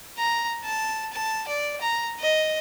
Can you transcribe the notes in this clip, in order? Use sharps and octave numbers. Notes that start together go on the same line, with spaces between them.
A#5
A5
A5
D5
A#5
D#5